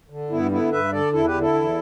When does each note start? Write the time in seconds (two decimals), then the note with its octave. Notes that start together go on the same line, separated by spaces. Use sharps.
0.10 D3
0.30 G2 B3 E4
0.51 D3 B3 E4
0.72 G2 B4 E5
0.92 D3 A4 D5
1.13 E2 E4 A4
1.26 G4 B4
1.34 D3
1.40 E4 A4
1.54 E2